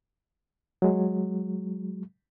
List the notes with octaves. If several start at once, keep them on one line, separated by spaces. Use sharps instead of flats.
F#3 G#3